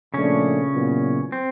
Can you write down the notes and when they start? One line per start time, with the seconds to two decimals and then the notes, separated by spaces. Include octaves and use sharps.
0.14 A#2 C#3 F3 A3 C#4 D4
0.72 A#2 F#3 B3 E4
1.32 C4